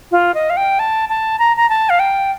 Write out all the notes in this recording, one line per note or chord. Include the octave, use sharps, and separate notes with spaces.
F4
D#5
F5
G5
A5
A5
A#5
A#5
A5
F5
G5